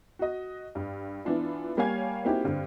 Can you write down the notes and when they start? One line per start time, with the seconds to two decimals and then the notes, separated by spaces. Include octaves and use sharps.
0.19 F#4 D#5
0.75 G2
1.25 E3 B3 D4 F4
1.77 G3 A#3 C#5 F5 G#5 G#6
2.25 A#3 C4 D#4 E4 F#4 G4
2.44 G2 D3 C4